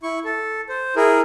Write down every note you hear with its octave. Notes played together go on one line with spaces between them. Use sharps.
E4 C#6
A4
C5
E4 G#4 A#4